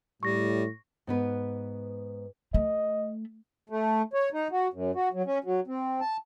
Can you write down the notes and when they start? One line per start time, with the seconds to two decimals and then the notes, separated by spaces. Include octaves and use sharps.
0.23 A2 G3 C#6 A#6
1.07 G#2 B3 B4
2.54 A3 D#5
3.70 A3
4.14 C#5
4.33 D#4
4.52 F#4
4.73 F#2
4.95 F#4
5.13 F#3
5.26 C#4
5.44 F#3
5.67 C4
6.01 A5